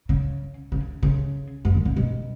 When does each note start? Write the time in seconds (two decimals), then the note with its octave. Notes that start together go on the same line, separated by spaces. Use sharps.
0.09 C#3
0.72 C#3
1.03 C#3
1.65 F#2
1.75 D3
1.86 C#3
1.97 B2